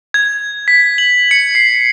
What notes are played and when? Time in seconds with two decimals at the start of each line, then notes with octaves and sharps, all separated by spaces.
0.14 G#6
0.68 B6
0.98 F#7
1.31 C#7
1.55 C7